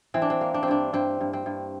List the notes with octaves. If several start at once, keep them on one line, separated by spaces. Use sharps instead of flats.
E3 C4
D4
C4
A#3
D4
C4
G2 D4
G2 C4
G2
C4
G2